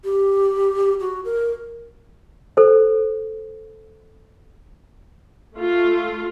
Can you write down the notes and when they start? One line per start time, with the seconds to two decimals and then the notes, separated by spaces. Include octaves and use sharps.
0.04 G4
1.01 F#4
1.25 A#4
2.57 A4 C5
5.54 A3 F4